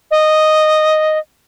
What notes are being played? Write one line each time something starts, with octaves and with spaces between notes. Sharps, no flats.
D#5